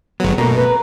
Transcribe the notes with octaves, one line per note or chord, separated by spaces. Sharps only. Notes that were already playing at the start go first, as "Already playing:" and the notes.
G1 F#3 G#3 B3
B2 A3 A#3 C#4 A#5
B4